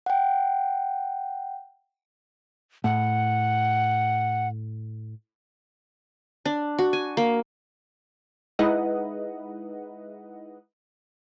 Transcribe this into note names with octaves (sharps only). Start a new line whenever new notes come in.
F#5 G5
A2 F#5
D4
F#4
G#5
A#3
G#3 D#4 E4 B4 D#5 F#5